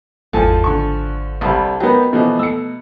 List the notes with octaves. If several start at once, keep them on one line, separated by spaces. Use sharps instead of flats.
G#1 E2 G#2 F3 A4 G#5 A5
G#1 D3 C#6
C2 G3 E4 A4
F#3 B3 D#4 A#4 G5
B2 E3 F3 A3
A3 E6 C#7